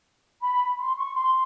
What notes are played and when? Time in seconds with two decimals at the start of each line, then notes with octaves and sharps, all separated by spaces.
0.41 B5
0.79 C6
0.97 C#6
1.15 C6